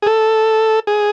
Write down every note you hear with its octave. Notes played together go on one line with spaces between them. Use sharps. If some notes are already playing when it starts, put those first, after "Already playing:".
G#4
A4
G#4